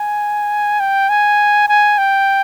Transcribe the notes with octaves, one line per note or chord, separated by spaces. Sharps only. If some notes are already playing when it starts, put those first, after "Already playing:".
Already playing: G#5
G5
G#5
G#5
G5